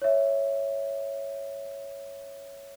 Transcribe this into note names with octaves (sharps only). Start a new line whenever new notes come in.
C#5 E5